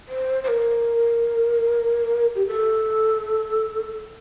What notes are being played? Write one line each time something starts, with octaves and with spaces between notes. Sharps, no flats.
C5
C5
A#4
G4
A4